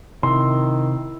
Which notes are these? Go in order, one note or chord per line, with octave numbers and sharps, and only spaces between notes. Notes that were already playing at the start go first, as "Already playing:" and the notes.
C3 D#3 E4 C6 E6